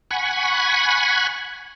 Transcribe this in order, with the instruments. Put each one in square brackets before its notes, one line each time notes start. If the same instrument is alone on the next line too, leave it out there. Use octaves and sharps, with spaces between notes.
[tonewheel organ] F#5 G#5 B5 C#6